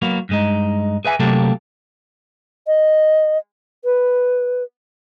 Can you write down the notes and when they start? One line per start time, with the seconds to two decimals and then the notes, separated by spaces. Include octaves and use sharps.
0.02 F#3 A#3 B3
0.29 G2 G#3 D#4
1.05 G#4 B4 E5 G#5
1.19 C3 F#3 A3 A#3 G4 A4
2.67 D#5
3.85 B4